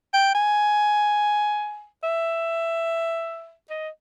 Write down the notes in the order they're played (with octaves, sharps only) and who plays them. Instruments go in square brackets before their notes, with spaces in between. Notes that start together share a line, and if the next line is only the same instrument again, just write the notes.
[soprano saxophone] G5
G#5
E5
D#5